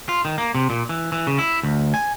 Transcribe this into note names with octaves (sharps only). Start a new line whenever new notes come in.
F4
D#3
A#3
C3
A#2
E3
E3
C#3
E4
D2
G#5